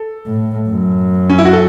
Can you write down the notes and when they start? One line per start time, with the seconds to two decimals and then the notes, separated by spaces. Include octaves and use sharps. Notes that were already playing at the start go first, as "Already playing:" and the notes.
Already playing: A4
0.27 A2
0.69 F#2
1.30 C#4
1.38 E4
1.45 F#4
1.53 A4